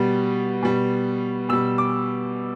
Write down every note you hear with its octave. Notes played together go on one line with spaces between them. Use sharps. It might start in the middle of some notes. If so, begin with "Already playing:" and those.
Already playing: B2 G3
B2 G3
B2 G3 E6
D6